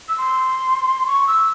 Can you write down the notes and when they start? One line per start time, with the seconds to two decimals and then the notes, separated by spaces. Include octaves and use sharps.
0.09 E6
0.18 C6
1.07 C#6
1.27 E6